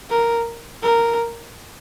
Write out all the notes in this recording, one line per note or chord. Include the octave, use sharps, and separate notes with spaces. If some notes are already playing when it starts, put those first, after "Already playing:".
A#4
A#4